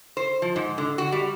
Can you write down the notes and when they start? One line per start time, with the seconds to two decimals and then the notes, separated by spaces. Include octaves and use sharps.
0.17 C5
0.42 F3
0.56 G#2
0.78 D3
0.98 F#4
1.12 G3